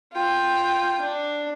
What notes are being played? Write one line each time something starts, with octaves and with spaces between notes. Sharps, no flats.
F4 G5
D4